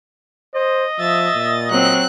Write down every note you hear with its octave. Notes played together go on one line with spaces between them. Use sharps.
C5 D#5
F3 E5 A6
A#2
F#3 C4 F#6